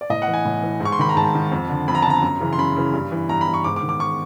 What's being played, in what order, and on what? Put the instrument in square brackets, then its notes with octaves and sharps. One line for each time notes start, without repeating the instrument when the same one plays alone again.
[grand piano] D5
A2 D#5
F#5
E3
G#5
A2
E3
G#2
C#6
C6
D#3 B5
A#5
G#2 A5
D#3
F2
D3
F2 B5
A#5
D3 A5
A#5
F#2
C#3 E3
C6
F#2 B5
C#3 E3
G2
E3
G2 A#5
B5
E3
C#6
G#2 D6
D6
D#3
D6
C#6